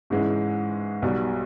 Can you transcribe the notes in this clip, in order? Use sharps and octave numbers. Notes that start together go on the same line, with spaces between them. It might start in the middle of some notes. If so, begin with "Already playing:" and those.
G#2 E3 G#3 C#4
B1 B2 G3